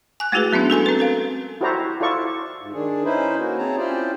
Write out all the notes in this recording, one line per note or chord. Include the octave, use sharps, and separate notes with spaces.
G#5 F#6
G#3 A3 E4 F#4 G#4 B4
F#3 B3 C#4 D4
F#4 A4 G#5 C6
C4 B4
A4 A#4 F5
E4 F#4 G4 C5 D5 A#5
E4 F4 A4 D5 C#6
G#2
D#3 D4 G#4
C#4 D#4 E4 B4 C5
A#3 C#4 F#4
C4 G#4 C#5 A5 A#5
C#4 E4 F4 G4 C5 D5